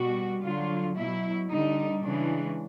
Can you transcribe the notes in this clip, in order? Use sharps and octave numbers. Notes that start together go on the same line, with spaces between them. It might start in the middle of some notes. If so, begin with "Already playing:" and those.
Already playing: B2 G3 F#4
D3 F#3 F4
B2 F#3 E4
D3 G3 D#4
C#3 E3 G#3 D4